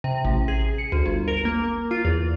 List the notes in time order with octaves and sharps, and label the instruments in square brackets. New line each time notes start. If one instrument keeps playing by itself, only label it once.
[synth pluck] C3
A1
G#4
C#7
D2
G1
A#4
A#3
F4
E2